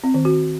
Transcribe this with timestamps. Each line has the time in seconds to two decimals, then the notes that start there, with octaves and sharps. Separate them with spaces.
0.04 C4
0.14 D#3
0.25 F#4